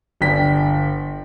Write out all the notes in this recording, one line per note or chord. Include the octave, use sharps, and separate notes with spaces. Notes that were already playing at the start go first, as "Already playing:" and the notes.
G1 D5 G5 B6